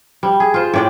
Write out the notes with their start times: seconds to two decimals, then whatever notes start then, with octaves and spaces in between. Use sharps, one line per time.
0.23 G3
0.40 G#4
0.54 F4 C5
0.74 A2 D5 G5